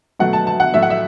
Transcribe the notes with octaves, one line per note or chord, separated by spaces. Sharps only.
B2 F#3 A3 F#5
A5
A5
F#5
A2 F#3 A3 E5
F#5
E5